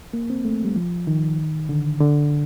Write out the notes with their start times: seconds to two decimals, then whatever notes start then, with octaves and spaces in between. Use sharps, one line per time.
0.13 A#3
0.30 C4
0.45 A3
0.65 G3
0.76 F3
1.07 D#3
1.69 D3
2.00 D3